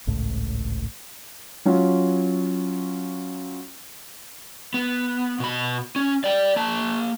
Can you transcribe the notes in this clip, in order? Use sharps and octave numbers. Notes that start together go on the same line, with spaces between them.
G#1 C#2 A2
F#3 C#4 F4
B3
B2 B5
C#4
D5 G5
A#3 A5